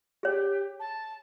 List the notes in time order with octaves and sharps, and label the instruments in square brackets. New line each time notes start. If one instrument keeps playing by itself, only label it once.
[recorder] G4 [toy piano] G#4 C#5
[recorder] A5